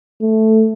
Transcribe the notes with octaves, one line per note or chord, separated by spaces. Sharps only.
A3